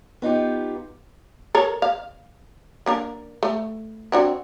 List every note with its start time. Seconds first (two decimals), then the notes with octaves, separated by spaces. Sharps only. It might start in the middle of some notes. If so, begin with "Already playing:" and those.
0.22 B3 D#4 F4 G4
1.55 A4 A#4 C#5
1.82 F5
2.86 A#3 D4 A#4
3.43 A3
4.12 C4 D4 F#4